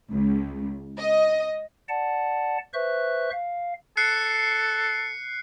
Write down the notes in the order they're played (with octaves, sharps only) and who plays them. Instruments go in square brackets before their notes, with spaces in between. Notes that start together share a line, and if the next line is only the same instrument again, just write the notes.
[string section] C#2
D#5
[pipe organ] D5 F#5 A5
B4 C5 E5 C#6 F#6
F5
[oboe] A4 [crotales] F#6 C7 C#7